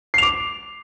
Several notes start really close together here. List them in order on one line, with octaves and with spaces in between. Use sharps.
C7 F7 D6